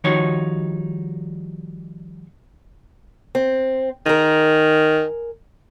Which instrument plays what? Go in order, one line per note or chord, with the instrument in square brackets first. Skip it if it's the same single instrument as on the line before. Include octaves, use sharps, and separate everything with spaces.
[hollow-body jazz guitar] D#3 F3 G3 D#4 F#4 C#5
[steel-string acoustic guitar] C4
[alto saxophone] D#3 [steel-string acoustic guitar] G#4 A#4